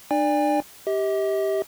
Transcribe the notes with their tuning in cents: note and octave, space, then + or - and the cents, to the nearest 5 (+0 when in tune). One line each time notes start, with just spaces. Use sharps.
D4 +40 D5 +0 G#5 -40
G4 +0 D#5 +45